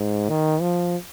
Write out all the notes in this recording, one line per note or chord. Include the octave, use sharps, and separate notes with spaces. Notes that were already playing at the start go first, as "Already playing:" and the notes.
Already playing: G#2
D#3
F3